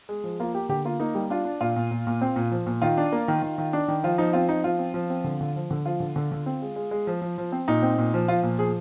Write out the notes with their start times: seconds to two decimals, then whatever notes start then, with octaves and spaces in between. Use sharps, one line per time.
0.09 G#3
0.24 F3
0.40 A#3 F4
0.55 A#3 G4
0.69 D3 G4
0.85 A#3 F4
1.00 A#3 D#4
1.15 G3
1.30 D4 F4
1.45 D4
1.61 A#2 F4
1.76 A#2
1.91 A#2
2.07 A#2
2.21 C4
2.36 A#2
2.52 F3
2.67 A#2
2.82 D#3 F4
2.97 D4
3.12 A#3
3.28 D#3
3.43 D#3
3.58 D#3
3.73 D4
3.88 D#3
4.04 F3 F4
4.18 F3 D#4
4.33 C4 F4
4.49 F3 D#4
4.64 F3 F4
4.79 C4
4.94 F3
5.10 C4
5.24 D3
5.41 D3
5.56 F3
5.71 D3
5.86 F3 F4
6.00 D3
6.16 D3
6.32 D3
6.46 C4
6.62 G#3
6.76 G#3
6.91 G#3
7.07 F3
7.22 F3
7.38 F3
7.52 C4
7.68 A#2 D#4
7.82 C4
7.99 A#2
8.14 F3
8.28 F3 F4
8.43 A#2
8.59 F3 G#4